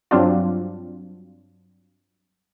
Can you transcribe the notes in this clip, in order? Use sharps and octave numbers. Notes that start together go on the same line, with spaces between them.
G2 F#3 C4 D4 F4